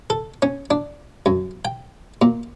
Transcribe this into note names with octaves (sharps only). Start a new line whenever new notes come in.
A4
C#4
D4
F#2
G5
A#2